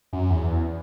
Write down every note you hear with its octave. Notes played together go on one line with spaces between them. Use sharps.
F#2
E2